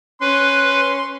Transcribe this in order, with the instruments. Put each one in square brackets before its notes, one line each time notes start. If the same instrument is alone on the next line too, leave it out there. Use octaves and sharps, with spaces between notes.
[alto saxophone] C#4 [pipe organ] B4 [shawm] C6